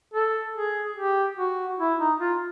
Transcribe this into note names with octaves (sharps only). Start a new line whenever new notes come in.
A4
G#4
G4
F#4
E4
D#4
F4